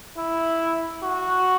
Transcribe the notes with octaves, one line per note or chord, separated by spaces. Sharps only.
E4
F#4